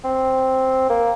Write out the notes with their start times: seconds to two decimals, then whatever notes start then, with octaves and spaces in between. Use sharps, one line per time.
0.05 C4
0.90 A#3